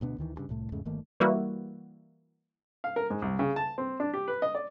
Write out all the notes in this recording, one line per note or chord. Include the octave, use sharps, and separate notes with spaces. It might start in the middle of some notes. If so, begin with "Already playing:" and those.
D2 B2 B3 D4
D2 D#3 E3
D2 G2 C#3
C2 A2 A3
E2 G#2 C#3 A3
G1 D#3 A3 A#3
E3 G3 A#3 E4 F#4
F5
A#4
G#2
C2
C#3
A5
C4
D4
G4
B4
D#5
D5